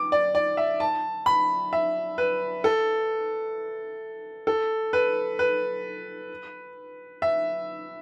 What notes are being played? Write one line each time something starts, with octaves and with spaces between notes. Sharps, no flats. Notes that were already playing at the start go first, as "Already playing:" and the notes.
Already playing: D6
D5
D5
E5
A5
B5
E5
B4
A4
A4
B4
B4
E5